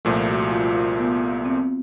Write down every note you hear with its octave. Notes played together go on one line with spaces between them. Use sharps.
C2 A#2 F3 A3 F4
F4
F#4
F4
F4
F4
B3
C4